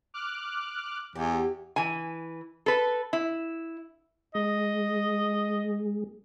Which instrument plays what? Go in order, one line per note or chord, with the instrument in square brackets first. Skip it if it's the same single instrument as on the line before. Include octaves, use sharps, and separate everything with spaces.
[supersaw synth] D6 F6 F#6
[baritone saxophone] E2 [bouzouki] G4
[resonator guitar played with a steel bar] E3 G#5
A4 B4
E4
[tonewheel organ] G#3 [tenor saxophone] D#5